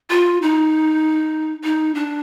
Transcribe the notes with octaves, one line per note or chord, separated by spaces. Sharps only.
F4
D#4
D#4
D4